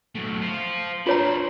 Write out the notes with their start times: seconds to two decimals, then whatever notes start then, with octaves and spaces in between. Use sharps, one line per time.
0.15 F#3 A3
0.42 C5 F5
1.07 D4 F4 C5 C#5 A#5